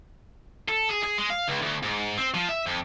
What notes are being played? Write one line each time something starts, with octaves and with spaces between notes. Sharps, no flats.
A4
G#4
G#4
G#3
F5
C#2
D2
G#2
C4
F3
E5
F2